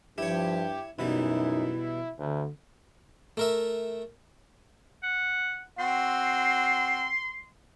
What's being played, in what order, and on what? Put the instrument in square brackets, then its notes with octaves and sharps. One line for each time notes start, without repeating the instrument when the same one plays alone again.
[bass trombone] G2 [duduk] F3 [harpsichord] E4 C#5 [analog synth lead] G4
[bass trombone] F#2 [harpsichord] B2 E3 G3 [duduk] D#4 [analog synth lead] E4
[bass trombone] D2 [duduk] D3
[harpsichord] A3 A#4 E5
[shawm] F#5
[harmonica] C4 F#4 [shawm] C6